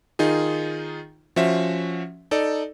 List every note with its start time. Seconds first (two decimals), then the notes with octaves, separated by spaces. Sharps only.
0.19 D#3 D#4 F4 G#4
1.36 F3 C#4 F#4 C5 E5
2.31 D#4 A4 D5